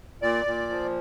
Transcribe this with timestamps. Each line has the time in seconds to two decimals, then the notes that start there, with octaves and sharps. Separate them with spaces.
0.21 A#2 D5
0.46 A#2
0.69 F3